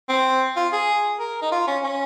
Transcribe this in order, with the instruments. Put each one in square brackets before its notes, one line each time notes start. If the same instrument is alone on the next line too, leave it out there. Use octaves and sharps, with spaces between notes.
[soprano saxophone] C4
F4
G#4
A#4
D#4
F4
C#4
C#4